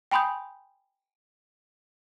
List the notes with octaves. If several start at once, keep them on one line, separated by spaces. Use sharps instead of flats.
G5 G#5 B5 C6 D#6 G6